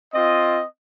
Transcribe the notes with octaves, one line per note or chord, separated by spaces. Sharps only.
C4 F4 D#5